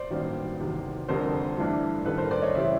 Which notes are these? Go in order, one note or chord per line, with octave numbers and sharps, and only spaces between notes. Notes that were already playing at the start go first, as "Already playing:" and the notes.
Already playing: C5 D5
A1 G2 D#3 F#3 A#3
E2 C3 D#3 F#3
F1 F2 D3 G3 A#4 C5
G2 E3 A3 D4
A1 G2 D#3 A4 B4
A#4 C5
C5 D5
C#5 D#5
C#3 E3 G3 C4 D5 E5